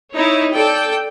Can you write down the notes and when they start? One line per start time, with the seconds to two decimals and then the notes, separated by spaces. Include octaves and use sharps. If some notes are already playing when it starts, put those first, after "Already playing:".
0.13 D#4 E4 C#5
0.52 A4 D5 G5